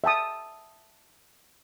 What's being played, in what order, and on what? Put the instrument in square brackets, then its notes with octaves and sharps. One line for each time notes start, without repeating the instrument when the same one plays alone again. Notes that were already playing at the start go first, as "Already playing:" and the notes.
[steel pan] E5 G5 A5 D#6